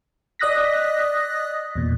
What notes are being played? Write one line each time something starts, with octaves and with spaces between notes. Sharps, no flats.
D5 D#5 D#6 F#6 A#6 B6
E2 A#2